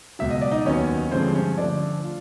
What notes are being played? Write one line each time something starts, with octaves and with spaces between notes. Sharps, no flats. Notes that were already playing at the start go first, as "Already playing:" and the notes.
C#2 B2 F#3 E5
D#5
D5
D#4 D#5
D#2 D#3 F#3 B3 C#4 C#5
G2 D3 F3 G#3 C4 C5
C#4 C#5
D3 F3 A3 D4 D5
F4